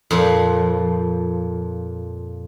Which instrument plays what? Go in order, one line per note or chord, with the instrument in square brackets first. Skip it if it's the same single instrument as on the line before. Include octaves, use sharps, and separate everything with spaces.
[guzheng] F2 A#2 F3